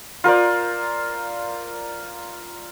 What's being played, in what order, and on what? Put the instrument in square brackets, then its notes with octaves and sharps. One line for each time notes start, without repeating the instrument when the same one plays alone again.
[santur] F4 A#4 C5 D5